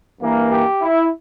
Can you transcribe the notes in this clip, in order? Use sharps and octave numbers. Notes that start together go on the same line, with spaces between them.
G2 E3 A#3
G4
E4